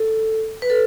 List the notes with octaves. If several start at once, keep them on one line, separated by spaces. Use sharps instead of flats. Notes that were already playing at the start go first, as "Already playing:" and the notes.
Already playing: A4
B4
A4